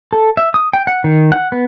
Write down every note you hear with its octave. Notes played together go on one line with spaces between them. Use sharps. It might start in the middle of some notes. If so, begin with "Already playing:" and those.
A4
E5
D#6
G5
F#5
D#3
F#5
B3